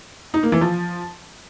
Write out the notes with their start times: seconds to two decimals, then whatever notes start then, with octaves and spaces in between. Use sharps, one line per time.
0.34 D#4
0.43 A#3
0.52 E3
0.61 F3